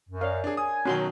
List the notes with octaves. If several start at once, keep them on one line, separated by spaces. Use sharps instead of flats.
F#2
A#4 C#5 D5 F5
D4 G#4
G#5 D#6
B2 D#3 F#3 C#4 F#4 C6